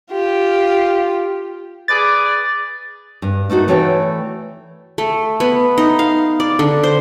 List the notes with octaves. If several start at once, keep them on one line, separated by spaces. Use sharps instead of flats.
F4 G4
G#4 B4 D5 A6
G2
A3 A#3 D#4 F#4
E3 A3 C#5 D5 G5
A3
B3
D#4
F5
D5
D3
C5